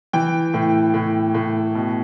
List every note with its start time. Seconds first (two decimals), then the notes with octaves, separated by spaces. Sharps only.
0.13 E3 G5
0.54 A2
0.94 A2
1.35 A2
1.75 B2